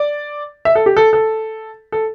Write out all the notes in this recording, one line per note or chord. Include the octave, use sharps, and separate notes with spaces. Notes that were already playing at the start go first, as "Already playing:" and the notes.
Already playing: D5
E5
A4
G4
A4
A4
A4